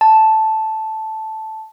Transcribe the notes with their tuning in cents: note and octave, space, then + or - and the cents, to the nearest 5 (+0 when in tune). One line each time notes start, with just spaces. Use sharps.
A5 -5